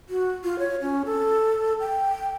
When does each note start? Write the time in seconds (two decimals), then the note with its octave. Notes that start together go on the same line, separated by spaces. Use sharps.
0.09 F#4
0.44 F4
0.59 C#5
0.81 C#4
1.05 A4
1.80 G5